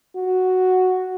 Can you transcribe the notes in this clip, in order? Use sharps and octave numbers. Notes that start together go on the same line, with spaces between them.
F#4